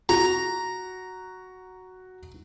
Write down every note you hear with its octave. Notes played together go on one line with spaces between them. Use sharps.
F#4 A#5